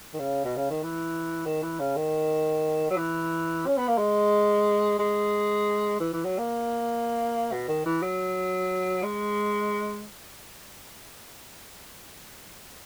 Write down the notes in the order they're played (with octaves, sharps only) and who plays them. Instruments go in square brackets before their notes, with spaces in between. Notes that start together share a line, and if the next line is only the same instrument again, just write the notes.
[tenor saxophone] D#3
C#3
B2
C#3
D#3
E3
D#3
E3
C#3
D#3
F#3
E3
C#4
B3
A#3
G#3
G#3
E3
E3
F#3
A#3
B2
D#3
E3
F#3
G#3